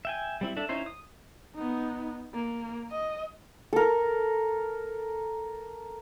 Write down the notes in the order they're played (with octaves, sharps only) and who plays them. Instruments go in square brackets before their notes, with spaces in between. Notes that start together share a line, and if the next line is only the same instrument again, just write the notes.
[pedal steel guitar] E5 G5 G#5
G3 C4 E4
D4 A4 E5
C#4 D#4 E4 C5
D#6
[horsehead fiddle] B3 D#4
A#3
D#5
[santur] A4 A#4